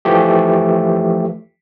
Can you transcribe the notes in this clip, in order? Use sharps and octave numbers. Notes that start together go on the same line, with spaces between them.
E3 F3 A3 G4